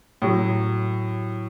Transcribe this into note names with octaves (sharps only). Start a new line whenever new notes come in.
A2 F#3